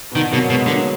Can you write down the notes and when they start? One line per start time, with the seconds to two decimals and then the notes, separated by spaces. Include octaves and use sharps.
0.12 B2
0.15 D3 D#3
0.32 B2 F#3 A#3
0.49 B2 G#3 B3
0.66 D3 F#3 A#3